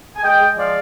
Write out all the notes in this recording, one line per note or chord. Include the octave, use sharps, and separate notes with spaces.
G#5
G#3 D#5 G5
G#3
F3 D5 F5